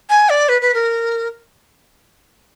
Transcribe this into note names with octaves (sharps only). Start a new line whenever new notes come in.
G#5
D5
B4
B4
A#4